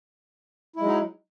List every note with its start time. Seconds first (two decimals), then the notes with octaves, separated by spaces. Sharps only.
0.76 E4
0.79 G#3
0.82 F#3
0.85 D#4